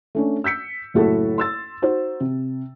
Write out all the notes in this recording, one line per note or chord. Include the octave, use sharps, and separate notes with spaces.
A3 C#4 D4
E6 G6 B6 C#7
F#1 A2 E4 F#4 A4
C6 E6 A6
D#4 F#4 C5
C3